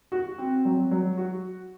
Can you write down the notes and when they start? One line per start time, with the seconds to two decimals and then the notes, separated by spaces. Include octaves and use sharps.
0.12 F#4
0.38 C4
0.65 F#3
0.91 F#3
1.18 F#4